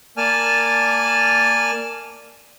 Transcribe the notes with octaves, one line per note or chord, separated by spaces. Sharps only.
A#3 D5 G#5 A5 F6